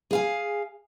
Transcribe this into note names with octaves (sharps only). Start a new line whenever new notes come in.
G#4 F5 G#5